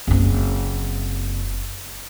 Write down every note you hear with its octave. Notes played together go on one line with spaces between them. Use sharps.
F#1 C4